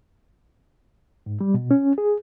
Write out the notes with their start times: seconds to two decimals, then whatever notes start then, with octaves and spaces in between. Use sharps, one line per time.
1.26 G#2
1.41 G3
1.54 B2
1.71 C#4
1.98 G#4